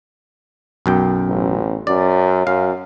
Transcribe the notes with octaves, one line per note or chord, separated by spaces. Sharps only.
B1 F#2 G5
A1
F#2 D5
F#2 F5